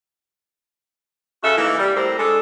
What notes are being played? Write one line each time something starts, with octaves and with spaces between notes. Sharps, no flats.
C#3 F#4 A4 E5
E3 A3 A#3 D#4 E4
G3
A2 G3 C4 A#4
G#3 D4 A4